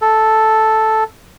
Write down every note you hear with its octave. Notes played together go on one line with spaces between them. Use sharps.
A4